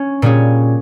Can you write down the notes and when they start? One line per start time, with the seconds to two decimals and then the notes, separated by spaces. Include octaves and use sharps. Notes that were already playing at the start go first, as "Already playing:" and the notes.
Already playing: C#4
0.22 A#2 G3 C#4 G#4